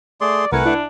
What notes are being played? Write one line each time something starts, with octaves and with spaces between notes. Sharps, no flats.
A3 G#4 D5 C6
C2 A3 A#4 B4 F#5 G#5 C#7
D4 E4